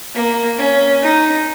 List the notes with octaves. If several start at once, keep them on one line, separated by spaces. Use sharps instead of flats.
A#3
C#4
D#4